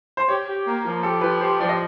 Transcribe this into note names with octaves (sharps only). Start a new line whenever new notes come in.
C5
G4 C#5
G4
A#3
F3
G4 A4
F3 B4
G4 C5
F3 D5
D#5